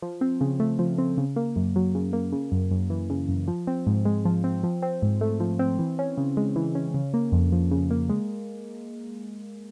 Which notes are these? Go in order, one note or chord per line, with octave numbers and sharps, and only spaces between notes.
F3
C4
C#3
A3
F3
C4
C#3
A#3
F#2
F#3
C#3
A#3
C#3
F#2
F#2
E3
C#3
F#2
F3
C4
G#2
G#3
F3
C4
F3
C4
G#2
A3
F3
C4
E3
C#4
C#3
G#3
E3
C#4
C#3
A#3
F2
F3
C#3
A#3
G#3